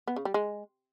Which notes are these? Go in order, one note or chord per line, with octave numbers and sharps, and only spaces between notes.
B3
C#3
G3
G#3